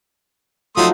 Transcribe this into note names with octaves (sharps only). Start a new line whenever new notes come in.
F3 F#3 A3 D#4 C6 D#6